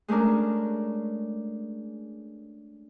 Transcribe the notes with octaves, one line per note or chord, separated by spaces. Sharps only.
G#3 A3 C#4 D4 A#4